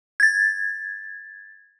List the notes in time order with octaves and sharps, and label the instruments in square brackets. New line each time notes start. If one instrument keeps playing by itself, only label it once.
[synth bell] G#6 A6